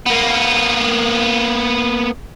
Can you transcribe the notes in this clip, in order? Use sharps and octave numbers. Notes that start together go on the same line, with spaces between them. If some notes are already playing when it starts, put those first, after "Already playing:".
A#3 B3